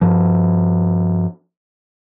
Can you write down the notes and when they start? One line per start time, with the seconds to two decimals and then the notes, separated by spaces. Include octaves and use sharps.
0.01 G2 F3